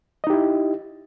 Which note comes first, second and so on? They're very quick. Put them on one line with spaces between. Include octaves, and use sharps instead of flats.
D#5 D#4 G4 E4